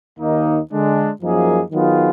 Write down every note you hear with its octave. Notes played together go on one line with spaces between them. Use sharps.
D#2 D#3 A#3 D#4
D3 G#3 D4
F#2 F3 A#3 D#4 G#4
D#3 F#3 B3 F4 G#4